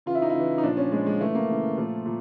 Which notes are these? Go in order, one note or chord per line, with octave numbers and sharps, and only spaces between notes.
C#3 E3 F4
E4
D#4
E4
C#3 E3
D#4
A#2 F3 D4
C#4
A#2 F3 G#3
G#3
C#3 E3 A3
A#3
C#3 E3
A#2 F3 A3
A#2